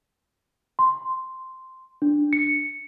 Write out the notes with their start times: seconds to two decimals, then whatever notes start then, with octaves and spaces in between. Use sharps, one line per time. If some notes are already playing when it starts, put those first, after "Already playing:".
0.79 C6
2.02 D4
2.33 C#7